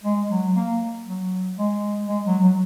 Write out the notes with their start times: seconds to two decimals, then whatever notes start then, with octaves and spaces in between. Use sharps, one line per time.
0.04 G#3
0.30 F#3
0.56 A#3
1.06 F#3
1.58 G#3
2.08 G#3
2.26 F#3
2.43 F#3